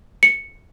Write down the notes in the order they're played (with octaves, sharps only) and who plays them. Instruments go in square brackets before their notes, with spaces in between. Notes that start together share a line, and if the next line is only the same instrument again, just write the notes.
[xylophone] C#7